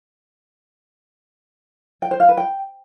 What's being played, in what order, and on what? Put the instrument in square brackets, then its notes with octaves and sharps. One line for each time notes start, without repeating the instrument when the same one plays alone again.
[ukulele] G5
C5
F5
B4
G5